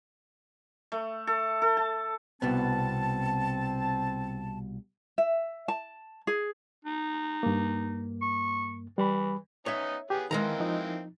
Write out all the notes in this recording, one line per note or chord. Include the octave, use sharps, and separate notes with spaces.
A3
A4
A4
A5
C2 B2 B3 C4 A5
E5
A5
G#4
D#4
G2 A#3
C#6
E3 G3 B5
B3 C#4 D#4 C#5 E5
B3 G4 G#4
D#3 E3 G#3 A#3 C4 A#4 A#5
F3 D#4